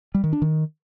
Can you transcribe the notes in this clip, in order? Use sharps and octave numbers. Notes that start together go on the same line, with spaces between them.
G3
D#3
D4
D#3